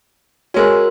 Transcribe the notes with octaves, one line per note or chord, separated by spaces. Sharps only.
G#3 C#4 F#4 A#4